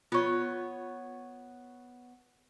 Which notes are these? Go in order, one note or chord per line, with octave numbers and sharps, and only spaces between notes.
B3 F4 C#5 C#6